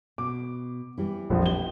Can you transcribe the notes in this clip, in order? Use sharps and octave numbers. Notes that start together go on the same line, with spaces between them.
B2 D6
E3 G3 E4
F1 A#1 F3
E4 G4 D#5 G7